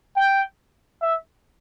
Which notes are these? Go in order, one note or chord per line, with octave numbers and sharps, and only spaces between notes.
G5
E5